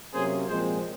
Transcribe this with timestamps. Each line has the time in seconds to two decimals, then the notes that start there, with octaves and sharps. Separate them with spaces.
0.14 C3 F#3 A#3 C#4 G#4 C5
0.48 A#2 F3 G#3 C4 G#4 C5